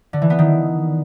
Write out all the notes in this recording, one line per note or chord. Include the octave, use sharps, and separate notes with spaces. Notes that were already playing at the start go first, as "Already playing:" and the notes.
D3
E3
B3
D#3